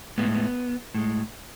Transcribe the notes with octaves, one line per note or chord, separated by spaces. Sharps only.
A2 G#3 B3
B3
A2 G#3